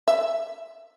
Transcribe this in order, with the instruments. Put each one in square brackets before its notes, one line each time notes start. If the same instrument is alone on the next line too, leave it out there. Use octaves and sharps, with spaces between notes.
[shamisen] E5